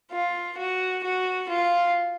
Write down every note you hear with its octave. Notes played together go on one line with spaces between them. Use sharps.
F4
F#4
F#4
F4